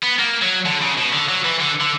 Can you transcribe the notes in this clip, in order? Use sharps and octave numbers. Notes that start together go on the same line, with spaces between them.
B3
A#3
F#3
D3
C#3
B2
D3
F#3
E3
D3
D3